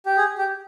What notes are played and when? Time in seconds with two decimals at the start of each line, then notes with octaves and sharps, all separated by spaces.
0.06 G4
0.17 G#4
0.38 G4